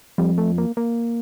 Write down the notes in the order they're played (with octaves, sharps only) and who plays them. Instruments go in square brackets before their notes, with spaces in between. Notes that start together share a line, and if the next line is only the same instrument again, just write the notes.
[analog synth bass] F2 [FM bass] G3
[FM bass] A3
A#3
A#3